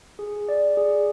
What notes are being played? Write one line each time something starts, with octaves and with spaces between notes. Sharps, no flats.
G#4
D5
G#4